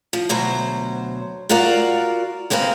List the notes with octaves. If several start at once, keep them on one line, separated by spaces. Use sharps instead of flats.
F3
D2 B2 F#3 C5
F4 F#4 A#4 D5 F5
G#3 A#3 C4 B4 F5